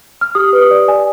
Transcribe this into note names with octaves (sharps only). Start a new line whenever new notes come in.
F6
G4 D#6
B4
D#6
D5
D5 G#5